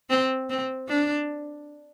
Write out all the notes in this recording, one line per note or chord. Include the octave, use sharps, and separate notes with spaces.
C4
C4
D4